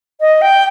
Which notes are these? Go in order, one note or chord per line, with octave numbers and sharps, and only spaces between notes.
D#5
G5